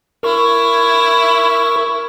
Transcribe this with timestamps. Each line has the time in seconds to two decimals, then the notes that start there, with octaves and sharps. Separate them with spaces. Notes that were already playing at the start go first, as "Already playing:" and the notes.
0.23 E4 A#4 C#6